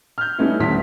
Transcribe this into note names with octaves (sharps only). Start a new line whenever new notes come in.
F6 G6
G3 A3 B3 C#4 D#4 E4
D#1 D2 E4 B6